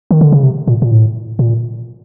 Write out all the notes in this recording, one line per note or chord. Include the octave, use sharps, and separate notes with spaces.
D#3
D3
C#3
C3
A#2
A#2
A2
A#2